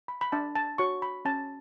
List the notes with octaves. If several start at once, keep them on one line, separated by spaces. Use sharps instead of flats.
B5
B5
D4 A5
A5
F#4 C#5 C#6
B5
C#4 A5